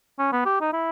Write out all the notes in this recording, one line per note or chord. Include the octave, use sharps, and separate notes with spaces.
C#4
B3
G4
D#4
E4